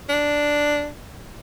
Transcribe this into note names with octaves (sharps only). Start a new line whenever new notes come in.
D4